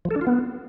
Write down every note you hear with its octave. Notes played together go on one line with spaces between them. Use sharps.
F3
A4
D4
F4
B3